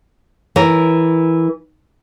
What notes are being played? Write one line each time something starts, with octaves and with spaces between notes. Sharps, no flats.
E3 A#4